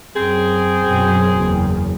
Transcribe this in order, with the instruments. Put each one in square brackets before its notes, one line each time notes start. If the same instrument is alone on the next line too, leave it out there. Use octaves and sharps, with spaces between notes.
[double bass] F#2 [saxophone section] C4 G#4
[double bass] F#2 B2
F#1 E2